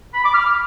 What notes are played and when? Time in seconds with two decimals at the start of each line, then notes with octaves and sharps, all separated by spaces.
0.14 B5
0.24 D6
0.35 F6